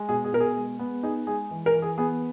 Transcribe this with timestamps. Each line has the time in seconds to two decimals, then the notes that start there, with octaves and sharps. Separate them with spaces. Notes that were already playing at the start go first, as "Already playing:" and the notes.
Already playing: G#3
0.09 B2 G#4
0.24 G#4
0.33 B2 A#4
0.40 G#4
0.56 G#3
0.79 B3
1.03 D#4 G#4
1.27 G#3 G#4
1.51 E3
1.66 A#4
1.74 E3
1.82 G#4
1.98 B3 G#4